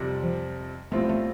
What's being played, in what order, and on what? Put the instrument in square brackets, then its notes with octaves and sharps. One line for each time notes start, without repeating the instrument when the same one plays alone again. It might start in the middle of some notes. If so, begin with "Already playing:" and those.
Already playing: [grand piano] F2 C3 G3
[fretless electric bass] F3
[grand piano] B1 A2 G3 C4 F4 [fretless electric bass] A3
[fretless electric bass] A3